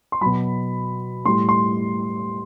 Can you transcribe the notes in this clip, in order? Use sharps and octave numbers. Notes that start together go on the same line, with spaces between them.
C6
B2 F#3 B5
A2 G3 C6
C6